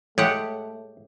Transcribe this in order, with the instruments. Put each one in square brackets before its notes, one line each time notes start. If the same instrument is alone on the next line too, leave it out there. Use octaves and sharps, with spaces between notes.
[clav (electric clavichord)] A2 [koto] G#3 G4 F#5 [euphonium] A3 [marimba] C#5